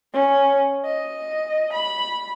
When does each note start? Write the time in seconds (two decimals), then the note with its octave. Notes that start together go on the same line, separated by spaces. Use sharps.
0.14 C#4
0.85 D#5
1.74 B5